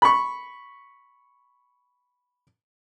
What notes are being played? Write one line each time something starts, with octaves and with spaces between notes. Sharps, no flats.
B5 C#6